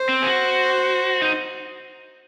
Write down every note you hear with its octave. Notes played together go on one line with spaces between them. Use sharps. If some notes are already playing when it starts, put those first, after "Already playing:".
Already playing: C5
C4
G#4
F#4
D#4